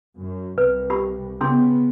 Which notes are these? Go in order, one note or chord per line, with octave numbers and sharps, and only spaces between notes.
F#2
C2 B4
G4 B5
C#3 B3 C#4 G#4 C6